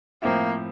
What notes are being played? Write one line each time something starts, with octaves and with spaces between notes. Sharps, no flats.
A2 F3 A#3 C4 E4